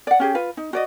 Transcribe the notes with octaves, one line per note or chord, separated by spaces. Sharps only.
D5 F#5
C#4 G4 G#4
F4 B4
D#4
F#4 D5 D#5